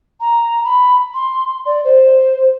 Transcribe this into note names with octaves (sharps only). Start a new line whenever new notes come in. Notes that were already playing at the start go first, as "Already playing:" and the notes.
A#5
B5
C6
D5
C5